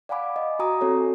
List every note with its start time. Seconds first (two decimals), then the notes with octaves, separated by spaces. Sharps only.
0.09 D5 F5 F#5 G#5 B5 D6
0.36 D#5
0.59 F#4 G#5 A#5 D#6
0.81 C4 F#4 A4 C#5